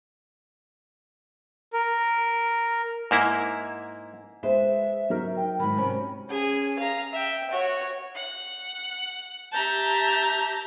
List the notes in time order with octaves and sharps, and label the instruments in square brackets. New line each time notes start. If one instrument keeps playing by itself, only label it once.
[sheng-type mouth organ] A#4
[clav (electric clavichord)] G#2 A#3 E4
[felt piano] G#3 [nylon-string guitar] B4 C5 [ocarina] E5
[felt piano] F#3 D#4 A#4
[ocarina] G5
[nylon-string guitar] G#2 D#3 [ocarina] B5
[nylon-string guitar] C3 C#4
[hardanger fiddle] C#4 G#4
F5 A#5
E5 G5
F#4 C#5
[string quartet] F#5
[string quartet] G4 E5 G6 [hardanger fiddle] A5 A#5